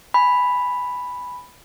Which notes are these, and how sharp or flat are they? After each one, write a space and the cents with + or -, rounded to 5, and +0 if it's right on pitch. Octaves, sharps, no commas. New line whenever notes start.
G#5 +0 B5 +0